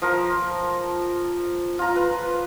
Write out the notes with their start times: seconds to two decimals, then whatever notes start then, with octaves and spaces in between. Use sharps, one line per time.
0.02 F3 A#4
1.79 F4 A#5
1.96 B4